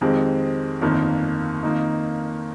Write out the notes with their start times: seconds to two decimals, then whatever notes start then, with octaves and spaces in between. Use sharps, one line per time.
0.01 F2 D#3 G#3 C4 G4
0.81 G1 F2 D#3 A#3
1.63 F2 D#3 A#3 D#4